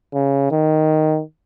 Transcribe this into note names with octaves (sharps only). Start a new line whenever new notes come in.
C#3
D#3